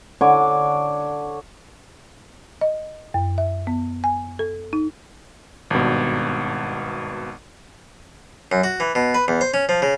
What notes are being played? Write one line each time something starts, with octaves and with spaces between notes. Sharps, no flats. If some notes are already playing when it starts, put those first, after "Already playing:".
D3 C#5 D6
D#5
F#2
E5
B3
G#5
A4
D#4
G#1 G2 B2
F#2
F#4
E3
B2
B4
E2
C5
C#4
F3
C#3